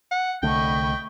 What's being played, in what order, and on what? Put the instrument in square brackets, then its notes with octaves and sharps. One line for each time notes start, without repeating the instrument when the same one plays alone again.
[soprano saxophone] F#5
[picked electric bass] C2 D3 A3 [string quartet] D#5 B5 C#6 [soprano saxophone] G5